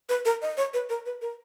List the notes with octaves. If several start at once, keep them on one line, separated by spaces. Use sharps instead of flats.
B4
A#4
D#5
C#5
B4
A#4
B4
A#4